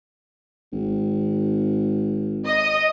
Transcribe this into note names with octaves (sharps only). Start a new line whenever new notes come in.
G#1
D#5